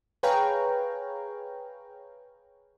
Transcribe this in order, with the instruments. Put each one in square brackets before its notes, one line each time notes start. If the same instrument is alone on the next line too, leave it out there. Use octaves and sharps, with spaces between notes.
[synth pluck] G#4 B4 C#5 F5 G5 A#5